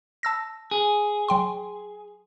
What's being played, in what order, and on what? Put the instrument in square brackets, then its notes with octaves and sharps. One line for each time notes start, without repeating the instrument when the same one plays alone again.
[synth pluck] A5 E6 A#6
[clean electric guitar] G#4
[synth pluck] F#3 G5 C6